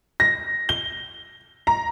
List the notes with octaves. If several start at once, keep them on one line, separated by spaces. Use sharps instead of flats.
A#6
G7
A#5